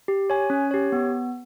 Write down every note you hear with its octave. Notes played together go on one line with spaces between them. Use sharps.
G4
C#5 G#5
C#4
G4 C#5
B3